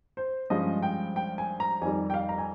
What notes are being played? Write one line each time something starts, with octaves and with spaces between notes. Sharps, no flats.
C5
G2 F3 G#3 C#4 D#5
G5
G5
G#5
A#5
F2 D#3 G3 G#5
G5
F5
A#5
G#5